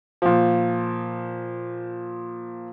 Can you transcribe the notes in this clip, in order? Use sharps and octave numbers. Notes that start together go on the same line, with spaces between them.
A#2 F3